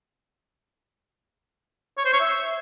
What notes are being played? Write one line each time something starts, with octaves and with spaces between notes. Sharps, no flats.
C#5
C5
C#5
E5